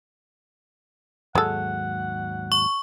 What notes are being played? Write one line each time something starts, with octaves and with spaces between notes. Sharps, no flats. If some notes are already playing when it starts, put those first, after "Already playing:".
D#2 G#2 F#3 G#3 A4 F#5
C#6